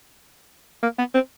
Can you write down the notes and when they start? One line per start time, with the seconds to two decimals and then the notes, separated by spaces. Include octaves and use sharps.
0.83 A#3
0.98 B3
1.14 C4